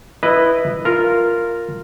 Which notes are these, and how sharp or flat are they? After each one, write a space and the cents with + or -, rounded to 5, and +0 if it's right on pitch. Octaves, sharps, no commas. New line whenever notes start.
E4 +0 B4 +0 D#5 -15
F4 +0 A#4 -10